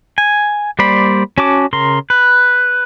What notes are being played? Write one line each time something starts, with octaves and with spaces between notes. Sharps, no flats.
G#5
G3 A#3 C5 D5 B5
C#4 F#4 A5 D6
C#3 A#4 C6
B4